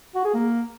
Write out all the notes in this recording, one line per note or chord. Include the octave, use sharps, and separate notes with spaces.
F#4
G#4
A#3